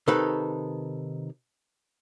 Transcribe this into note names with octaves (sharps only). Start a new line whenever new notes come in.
C3 D#3 D#4 A4 B4